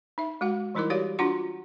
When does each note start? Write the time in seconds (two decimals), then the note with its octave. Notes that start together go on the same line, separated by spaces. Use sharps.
0.18 D#4 E5
0.41 G#3 F#4 F#5
0.75 E3 G3 D#4 E4 A#4 D6
0.90 F#4 G4 C#5 D5 F5 D6
1.19 D4 F4 F#4 F#5 C6